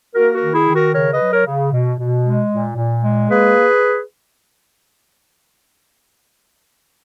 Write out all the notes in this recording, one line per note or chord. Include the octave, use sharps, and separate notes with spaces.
A#3 F#4 A#4
F#4 A#4
D#3
E4 G#4
D#3
F#4 A#4
C#3 A#4 C#5
B4 D#5
F#3
A#4 C#5
C#3
B2
B2
G#3
A#2
A#2
G#3
A#3 G#4 B4